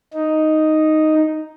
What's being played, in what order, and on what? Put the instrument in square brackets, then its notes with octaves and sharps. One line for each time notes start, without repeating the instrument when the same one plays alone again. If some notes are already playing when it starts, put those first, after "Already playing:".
[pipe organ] D#4